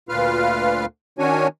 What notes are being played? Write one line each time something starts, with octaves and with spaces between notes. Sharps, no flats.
D2 A#2 F4 B4 F5 F6
D#3 C#4 D4 F#4 C#5 G#5